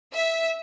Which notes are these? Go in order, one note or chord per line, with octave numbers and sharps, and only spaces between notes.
E5